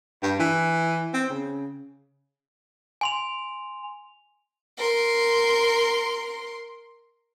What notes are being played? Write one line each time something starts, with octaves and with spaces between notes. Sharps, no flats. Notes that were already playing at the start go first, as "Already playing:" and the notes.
G2
E3
C4
C#3
G#5 C6 F7
A#4 C6